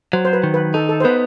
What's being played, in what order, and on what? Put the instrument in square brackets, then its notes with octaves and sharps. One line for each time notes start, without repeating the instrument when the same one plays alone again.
[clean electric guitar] F#3 [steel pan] C5
[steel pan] C5
B4
[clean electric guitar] D#3
[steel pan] B4
[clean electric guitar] D#4 [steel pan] A4
[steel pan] A4
C5
[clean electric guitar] B3 [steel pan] B4